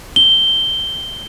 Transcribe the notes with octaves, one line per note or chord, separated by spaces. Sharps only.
G7